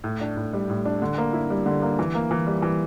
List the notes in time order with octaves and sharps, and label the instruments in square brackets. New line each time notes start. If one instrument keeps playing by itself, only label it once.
[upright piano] A2
D4
A2
G3
A2
D4
D3
A#3
E4
G3
D3
A#3
E3
A#3
E3
G3
E3